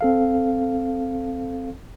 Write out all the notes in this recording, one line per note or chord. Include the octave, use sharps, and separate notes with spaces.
C4 A4 F5